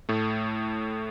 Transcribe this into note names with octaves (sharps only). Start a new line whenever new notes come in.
A2 A3